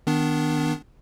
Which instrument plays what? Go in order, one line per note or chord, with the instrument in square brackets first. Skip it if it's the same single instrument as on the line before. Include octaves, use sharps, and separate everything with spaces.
[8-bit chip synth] D#3 B3 D4